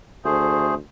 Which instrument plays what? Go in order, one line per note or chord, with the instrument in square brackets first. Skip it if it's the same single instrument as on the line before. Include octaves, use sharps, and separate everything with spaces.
[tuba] D2 [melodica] A3 G#4 C5